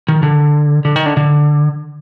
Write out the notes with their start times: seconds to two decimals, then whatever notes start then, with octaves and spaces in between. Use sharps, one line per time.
0.08 D#3
0.23 D3
0.85 D3
0.96 D#3
1.06 D3
1.17 D3